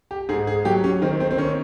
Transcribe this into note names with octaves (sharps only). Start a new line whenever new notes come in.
G4
G#2 G#4
G#4
F#3 G4
C#4
D#3 C4
C4
C4
D#3 C#4